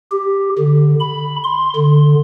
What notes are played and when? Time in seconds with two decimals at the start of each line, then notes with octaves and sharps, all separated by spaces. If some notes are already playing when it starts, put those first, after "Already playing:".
0.12 G4
0.59 D3
1.00 B5
1.44 C6
1.76 D3